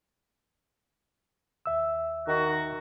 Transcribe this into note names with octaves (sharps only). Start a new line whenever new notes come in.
D#2 E5 E6
D#3 F#4